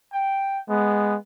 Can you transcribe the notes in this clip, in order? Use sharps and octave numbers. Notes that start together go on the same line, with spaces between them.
G5
G#3 B3